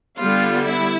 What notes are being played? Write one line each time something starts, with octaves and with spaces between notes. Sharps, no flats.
D3 G3 B3 F4
E4